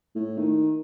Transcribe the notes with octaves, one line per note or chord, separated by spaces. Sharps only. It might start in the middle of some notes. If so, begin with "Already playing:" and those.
A2
D#3